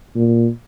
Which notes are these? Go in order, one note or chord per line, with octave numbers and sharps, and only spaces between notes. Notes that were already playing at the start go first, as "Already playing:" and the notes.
A#2